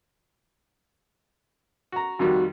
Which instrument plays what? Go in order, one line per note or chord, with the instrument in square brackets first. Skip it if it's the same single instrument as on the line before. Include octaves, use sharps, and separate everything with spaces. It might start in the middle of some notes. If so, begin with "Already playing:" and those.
[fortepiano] F#4 A#5
[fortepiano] F2 D#3 G3 [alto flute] F#4